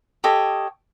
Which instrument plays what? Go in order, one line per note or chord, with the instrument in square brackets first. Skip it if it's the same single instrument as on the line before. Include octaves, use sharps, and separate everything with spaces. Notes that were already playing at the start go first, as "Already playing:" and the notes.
[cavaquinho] G4 A4 C#5 D#5